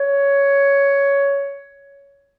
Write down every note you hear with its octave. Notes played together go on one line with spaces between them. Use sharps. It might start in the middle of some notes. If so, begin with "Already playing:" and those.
Already playing: C#5